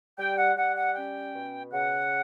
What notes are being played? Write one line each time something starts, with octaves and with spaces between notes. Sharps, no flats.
G3 G5
F#5
G3 F#5
F#5
C#4 G5
B2
C#3 F#5